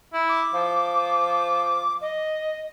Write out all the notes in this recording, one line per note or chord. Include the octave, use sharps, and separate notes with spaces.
E4
D6
F3
D#5